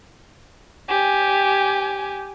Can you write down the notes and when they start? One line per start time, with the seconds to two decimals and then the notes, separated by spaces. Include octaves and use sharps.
0.88 G4 G#5